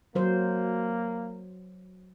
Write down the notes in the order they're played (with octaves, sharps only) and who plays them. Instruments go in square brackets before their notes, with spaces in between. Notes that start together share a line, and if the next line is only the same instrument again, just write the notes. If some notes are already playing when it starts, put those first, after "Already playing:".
[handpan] F#3 C5 [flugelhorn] A#3